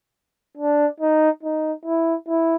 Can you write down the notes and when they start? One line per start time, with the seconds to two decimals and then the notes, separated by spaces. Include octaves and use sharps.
0.57 D4
1.00 D#4
1.43 D#4
1.86 E4
2.28 E4